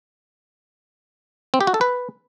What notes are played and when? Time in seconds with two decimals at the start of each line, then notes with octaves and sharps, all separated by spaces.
1.54 C4
1.61 G4
1.67 F#4
1.74 A4
1.81 B4